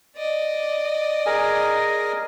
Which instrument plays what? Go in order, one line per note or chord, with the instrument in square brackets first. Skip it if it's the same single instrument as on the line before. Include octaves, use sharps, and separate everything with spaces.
[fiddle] D5 D#5
[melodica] G#4 A#4 G#5